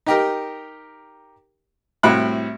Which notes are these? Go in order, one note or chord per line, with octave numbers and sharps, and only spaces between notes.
D#4 G4 A#4
C2 A2 F#4 B5 F#6